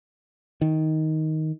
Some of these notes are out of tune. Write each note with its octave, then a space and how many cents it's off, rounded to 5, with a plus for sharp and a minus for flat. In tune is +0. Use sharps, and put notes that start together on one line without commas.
D#3 +10